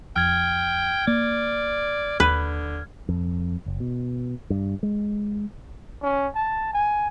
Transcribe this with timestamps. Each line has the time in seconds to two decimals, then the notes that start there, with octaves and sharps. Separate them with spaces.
0.16 F2 G5 F6 G#6
1.08 A#3 D5
2.20 D#2 D3 B4
3.09 F2
3.66 F#1
3.80 B2
4.50 G2
4.83 G#3
6.03 C#4
6.35 A5
6.74 G#5